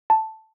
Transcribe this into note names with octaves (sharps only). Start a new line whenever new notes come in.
A5